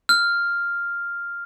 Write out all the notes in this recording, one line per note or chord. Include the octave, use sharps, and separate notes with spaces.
F6